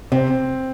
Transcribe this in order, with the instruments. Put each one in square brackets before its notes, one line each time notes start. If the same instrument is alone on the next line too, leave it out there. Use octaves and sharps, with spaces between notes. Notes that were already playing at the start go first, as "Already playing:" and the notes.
[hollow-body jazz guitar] C3 [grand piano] C4